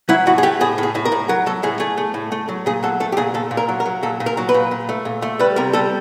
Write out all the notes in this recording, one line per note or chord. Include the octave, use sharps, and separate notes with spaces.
F#3 E4
A2 F#4
G#4
A3 G4
A2 G#4
A2
G#4
A2
A#4
A2
F#3 A#4
F#3 A4
A2 G#4
A3 G#4
A3
A2
A3
F#3
A#2 G#4
F#3 A4
A3 A4
G4
A#2 G#4
A#2 A4
A#2
A#4
F#3
A#4
F#3
A#2 A4
A#2
A#4
F#3
B4
A#2
A#2
A3
A#2
A3
G3 B4
C3 A#4
G3 A4